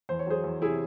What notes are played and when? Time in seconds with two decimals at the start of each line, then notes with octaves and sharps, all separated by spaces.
0.09 E2 C5
0.19 C#5
0.27 F#3 G#4 C5
0.44 E2
0.62 C3 E4 G#4